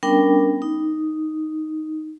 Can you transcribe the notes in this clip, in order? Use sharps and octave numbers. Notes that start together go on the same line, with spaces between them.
G3 B3 C#4 D4 A#4 G5
D#4